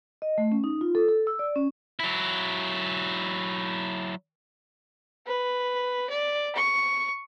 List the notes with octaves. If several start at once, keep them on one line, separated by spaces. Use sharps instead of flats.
D#5
A3
C#4
D#4
F4
A4
A4
E6
D5
C#4
F#3 E4
B4
D5
C#6